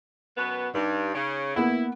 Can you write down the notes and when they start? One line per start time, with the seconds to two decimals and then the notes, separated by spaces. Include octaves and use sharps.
0.37 F#2 B2 B3
0.74 G2 D#4
1.15 C#3
1.56 A#3 B3 E4 F#5